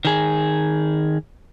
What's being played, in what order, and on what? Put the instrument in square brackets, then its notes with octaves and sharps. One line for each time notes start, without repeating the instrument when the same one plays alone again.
[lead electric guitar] D#3 G#4